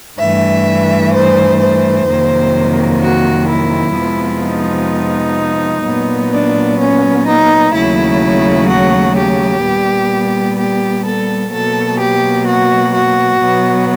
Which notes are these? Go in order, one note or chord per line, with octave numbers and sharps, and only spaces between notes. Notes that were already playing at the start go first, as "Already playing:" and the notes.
G2 E3 A3 E5
C5
C5
F2 C3 D#3 F#3 A#3
F#4
E4
F2 C3 F3 G#3 B3
D#4
A#2 F#3 B3
D4
C#4
D#4
D#2 C#3 F#3 A3 E4
F#4
G4
A#2 G3 B3
G4
A4
B2 F#3 A#3 A4
G4
F#4
F#4
B2 F#3 B3